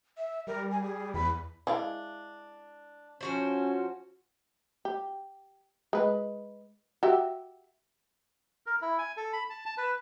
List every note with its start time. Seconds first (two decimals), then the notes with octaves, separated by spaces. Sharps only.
0.18 E5
0.47 G3 A#4
0.71 G#5
0.83 G#4
1.14 E2 B5
1.67 G#3 D4 E4 F5
3.21 F3 C#4 F#4 C5
4.85 G4
5.93 G#3 B4
7.03 F#4 G4 E5
8.66 A#4
8.82 E4
8.99 G#5
9.17 A4
9.33 B5
9.50 A5
9.66 A5
9.78 B4